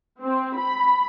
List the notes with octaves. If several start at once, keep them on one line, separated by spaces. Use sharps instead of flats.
C4
B5